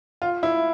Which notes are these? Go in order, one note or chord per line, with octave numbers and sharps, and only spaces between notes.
F4
E4